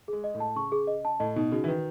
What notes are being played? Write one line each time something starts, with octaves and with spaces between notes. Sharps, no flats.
G#3 G#4
D#5
A2
A5
C#3 C#6
G#4
D#5
A5
A2 D#5
B2 D#4
C#3 F#4
E3
D#3 B4